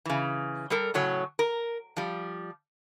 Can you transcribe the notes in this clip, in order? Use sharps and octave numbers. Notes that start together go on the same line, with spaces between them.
C#3 E3
G3 A4 A#4
A2 C#3 F#3 C#5
A#4
F3 G3